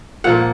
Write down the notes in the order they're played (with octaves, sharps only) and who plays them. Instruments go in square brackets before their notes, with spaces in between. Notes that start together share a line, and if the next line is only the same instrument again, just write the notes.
[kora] A#2 F3 A#3 F#5